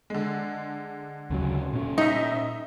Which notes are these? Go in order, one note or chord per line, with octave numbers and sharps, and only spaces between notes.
D3 G#3
D2 C#3 F#3
A#2 C#4
D#4 D#5 E5